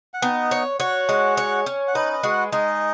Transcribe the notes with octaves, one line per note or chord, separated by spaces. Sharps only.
F#5
B3 D#4 D#5
C#5
F#4 C#5 F#5
G#3
C#5
C#4
F#5
D#4 B4 D#5
D#5
G#3 F#4 F#5
G#3 D#4 D#5